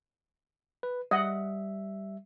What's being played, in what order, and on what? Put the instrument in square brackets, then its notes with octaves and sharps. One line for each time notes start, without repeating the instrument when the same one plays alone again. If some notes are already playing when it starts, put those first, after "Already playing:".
[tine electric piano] B4
[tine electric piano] G3 E5 [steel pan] D#5 F#5